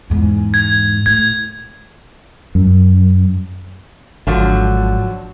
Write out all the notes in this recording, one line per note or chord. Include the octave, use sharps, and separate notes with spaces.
E2 G#2
G#6
A2 G#6
F#2
G#1 D3 F3 F#3